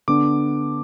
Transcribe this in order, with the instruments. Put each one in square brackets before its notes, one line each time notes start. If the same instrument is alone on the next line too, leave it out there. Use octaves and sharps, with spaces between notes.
[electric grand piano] D3 B3 D4 D6